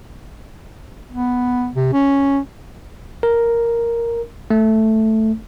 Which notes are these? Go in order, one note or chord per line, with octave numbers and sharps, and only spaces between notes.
B3
C3
C#4
A#4
A3